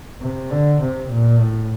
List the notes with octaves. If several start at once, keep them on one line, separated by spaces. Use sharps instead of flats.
C3
D3
C3
A#2
A2